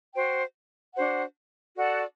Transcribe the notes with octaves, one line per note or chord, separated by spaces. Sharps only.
F#4 C5 G5
D4 F#4 C5 F#5
F#4 A4 D5 F#5